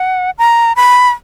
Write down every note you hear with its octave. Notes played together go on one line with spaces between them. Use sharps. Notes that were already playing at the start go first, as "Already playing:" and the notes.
Already playing: F#5
A#5
B5